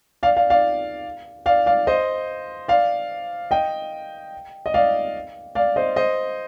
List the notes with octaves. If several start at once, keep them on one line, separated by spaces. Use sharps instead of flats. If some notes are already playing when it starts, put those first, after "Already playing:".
D5 F5
D5 F5
D5 F5
D5 F5
D5 F5
C5 D#5
D5 F5
D#5 G5
D#5
D5 F5
D5 F5
C5 D#5
C5 D#5